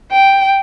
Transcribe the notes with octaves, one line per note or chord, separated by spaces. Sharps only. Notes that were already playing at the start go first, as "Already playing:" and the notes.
G5